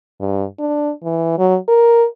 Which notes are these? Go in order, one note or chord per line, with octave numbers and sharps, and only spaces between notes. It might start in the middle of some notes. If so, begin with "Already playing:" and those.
G2
D4
E3
F#3
A#4